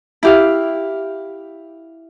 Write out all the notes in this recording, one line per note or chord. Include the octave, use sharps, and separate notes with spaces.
E4 G4 F5